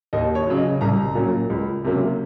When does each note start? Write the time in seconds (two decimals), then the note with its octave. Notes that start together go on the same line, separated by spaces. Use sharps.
0.13 D#2 D#5
0.35 C#5
0.47 C#3 F#3
0.58 D#5
0.81 C2 A#5
1.15 A#2 F#3 C#4
1.50 C#2
1.84 C3 F#3 A#3 C#4